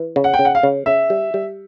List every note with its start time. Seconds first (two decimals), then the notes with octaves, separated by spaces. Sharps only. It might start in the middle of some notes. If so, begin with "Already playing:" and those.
Already playing: E3
0.16 C#3
0.24 F#5
0.34 G5
0.39 C#3
0.45 F#5
0.55 F5
0.63 C#3
0.86 C#3 E5
1.10 G3
1.34 G3